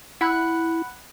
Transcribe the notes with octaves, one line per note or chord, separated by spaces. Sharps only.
E4 F#5 B5 F#6